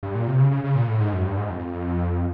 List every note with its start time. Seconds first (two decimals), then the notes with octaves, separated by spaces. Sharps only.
0.03 G2
0.15 A#2
0.28 C3
0.40 C#3
0.51 C#3
0.64 C#3
0.76 A#2
0.88 A2
1.00 G#2
1.13 F#2
1.25 G2
1.37 G#2
1.50 F2